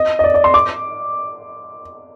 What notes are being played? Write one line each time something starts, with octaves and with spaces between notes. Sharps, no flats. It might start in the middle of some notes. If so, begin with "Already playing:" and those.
Already playing: D#5
D#5
D5
D5
C6
D6